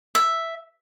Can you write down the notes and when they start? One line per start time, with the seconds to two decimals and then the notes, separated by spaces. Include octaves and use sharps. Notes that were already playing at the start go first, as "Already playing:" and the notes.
0.15 E5